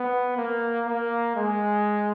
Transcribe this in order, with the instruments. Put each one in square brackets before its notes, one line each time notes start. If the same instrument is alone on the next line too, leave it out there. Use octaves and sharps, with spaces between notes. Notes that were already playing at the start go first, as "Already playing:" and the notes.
Already playing: [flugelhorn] B3
A#3
A#3
G#3